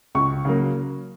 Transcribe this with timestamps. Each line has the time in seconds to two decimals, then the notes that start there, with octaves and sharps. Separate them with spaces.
0.15 C#2 C#6
0.45 C#3 F#3 A#3